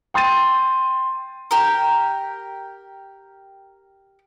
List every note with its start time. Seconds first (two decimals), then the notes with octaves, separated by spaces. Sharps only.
0.14 G5 C6 G6 A6 D#7
1.51 G4 A#4